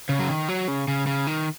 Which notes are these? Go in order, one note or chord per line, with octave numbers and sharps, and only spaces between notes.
C#3
F#3
D#3
F#3
C#3
C#3
C#3
D#3